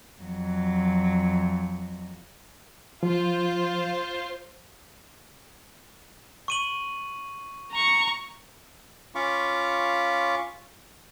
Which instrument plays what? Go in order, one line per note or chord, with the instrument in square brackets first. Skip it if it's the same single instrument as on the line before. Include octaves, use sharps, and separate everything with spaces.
[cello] F2 F#3
[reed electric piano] F3 [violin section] F4 C5
[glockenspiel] C#6 D#7 F#7
[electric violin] A#5 C#6
[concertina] C#4 F4 F5 B5 C#6 D6